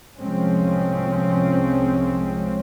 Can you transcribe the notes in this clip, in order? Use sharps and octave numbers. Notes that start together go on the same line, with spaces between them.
C2 F3 G#3 C4 C#4